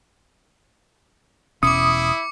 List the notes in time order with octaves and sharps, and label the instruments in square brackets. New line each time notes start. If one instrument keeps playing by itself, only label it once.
[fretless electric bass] E1 B2 C#4 [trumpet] E4 [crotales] D6 C#7 [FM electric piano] D#6